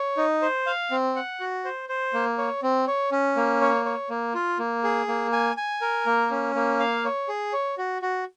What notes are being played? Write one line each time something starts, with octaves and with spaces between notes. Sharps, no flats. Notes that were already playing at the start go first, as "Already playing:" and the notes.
Already playing: C#5
D#4
C5
F5
C4
F#5
F#4
C5
C5
A#3
C#5
C4
C#5
C#4
A#3
C#5
C#5
A#3
F4
A#3
G#4
A#3
G#5
G#5
A#4
A#3
C#4
A#3
F5
C#5
G#4
C#5
F#4
F#4